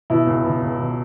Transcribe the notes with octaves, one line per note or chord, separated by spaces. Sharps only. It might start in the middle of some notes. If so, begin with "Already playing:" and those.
B2 E4
C#2
B2
C#2
B2